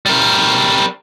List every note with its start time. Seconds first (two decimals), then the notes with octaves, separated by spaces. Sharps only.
0.06 G3 A#4